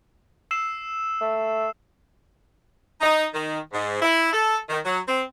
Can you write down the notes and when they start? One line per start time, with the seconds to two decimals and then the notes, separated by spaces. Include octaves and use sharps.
0.51 E6 C7 E7
1.21 A3
3.01 D#4
3.34 D#3
3.73 G#2
4.01 E4
4.33 A4
4.69 D#3
4.85 F#3
5.07 C4